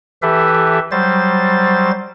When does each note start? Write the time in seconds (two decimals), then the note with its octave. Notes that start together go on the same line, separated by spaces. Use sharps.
0.22 E3 G4 A4 B4 E5
0.91 F#3 G3 C5 A6